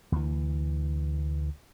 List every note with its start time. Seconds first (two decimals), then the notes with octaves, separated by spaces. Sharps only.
0.12 D2 E3